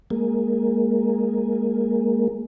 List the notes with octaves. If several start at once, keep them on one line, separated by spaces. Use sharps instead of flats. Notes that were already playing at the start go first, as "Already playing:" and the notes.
G#3 A#3